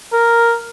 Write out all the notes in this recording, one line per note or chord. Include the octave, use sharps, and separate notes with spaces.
A#4